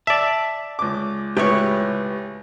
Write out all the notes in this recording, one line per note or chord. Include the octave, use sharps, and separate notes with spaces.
D5 E5 A5
C#2 D6
C#2 A2 G4 B4 C#5